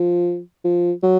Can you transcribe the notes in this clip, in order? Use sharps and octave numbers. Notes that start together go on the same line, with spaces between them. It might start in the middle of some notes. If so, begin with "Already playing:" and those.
Already playing: F3
F3
F#3